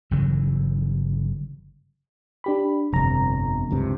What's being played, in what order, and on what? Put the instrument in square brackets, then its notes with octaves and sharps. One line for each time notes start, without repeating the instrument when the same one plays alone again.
[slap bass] G1 C#3 E3 F#3
[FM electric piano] D4 G4 B5
[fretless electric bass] G1 F2 [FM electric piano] C3 A#5
[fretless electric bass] C#2 G2 C3